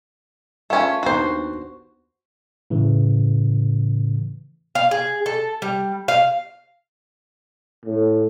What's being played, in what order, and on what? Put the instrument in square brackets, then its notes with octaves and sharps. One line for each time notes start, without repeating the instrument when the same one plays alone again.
[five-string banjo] A3 C#4 [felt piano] F4 F5
[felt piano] D#2 B3 D4 [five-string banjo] F#4 C5
[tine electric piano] A2 C#3 E3
[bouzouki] F5
G#4
A4
G3
F5
[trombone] A2